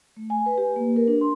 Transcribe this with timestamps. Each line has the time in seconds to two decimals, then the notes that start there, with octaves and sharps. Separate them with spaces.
0.17 A3
0.30 G#5
0.46 B4
0.58 G4
0.76 A#3
0.96 A#4
1.08 D4
1.21 C6